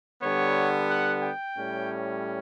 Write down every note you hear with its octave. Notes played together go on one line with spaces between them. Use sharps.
D3 G3 B3 C#5
F#5
G5
A2 G3 C#4